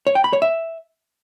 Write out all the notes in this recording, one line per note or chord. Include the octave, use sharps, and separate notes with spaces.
C#5
G5
B5
C#5
E5